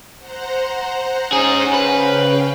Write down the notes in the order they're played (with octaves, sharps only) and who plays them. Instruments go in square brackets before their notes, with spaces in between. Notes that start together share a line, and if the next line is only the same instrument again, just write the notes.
[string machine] C5 F#5 A#5
[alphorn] C#4 [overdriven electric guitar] D#4 G#4
[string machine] C#3 F5 G5 [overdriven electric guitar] B4